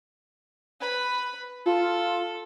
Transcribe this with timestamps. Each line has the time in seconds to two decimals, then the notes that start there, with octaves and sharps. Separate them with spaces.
0.80 B4 B5
1.66 F4 A4